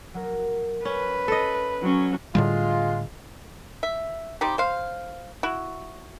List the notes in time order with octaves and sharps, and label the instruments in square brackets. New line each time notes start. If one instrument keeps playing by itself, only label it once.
[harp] F#3 F#4 A#4
[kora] C#4 [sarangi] B4
[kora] A4 D#5
[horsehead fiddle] F#3 C#4
[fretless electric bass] A2 D3 G3 [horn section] G#3 F4
[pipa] E5
G3 C4 D#4 G4
C5 F5
E4 F#4